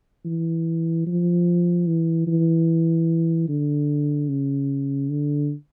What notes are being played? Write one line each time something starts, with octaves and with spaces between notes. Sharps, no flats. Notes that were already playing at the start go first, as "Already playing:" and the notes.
E3
F3
E3
E3
D3
C#3
D3